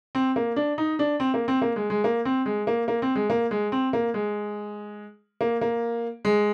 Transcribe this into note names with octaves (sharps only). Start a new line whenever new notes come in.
C4
A#3
D4
D#4
D4
C4
A#3
C4
A#3
G#3
G#3
A#3
C4
G#3
A#3
A#3
C4
G#3
A#3
G#3
C4
A#3
G#3
A#3
A#3
G#3